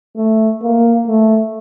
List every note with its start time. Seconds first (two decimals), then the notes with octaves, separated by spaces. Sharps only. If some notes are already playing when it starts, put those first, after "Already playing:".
0.17 A3
0.63 A#3
1.08 A3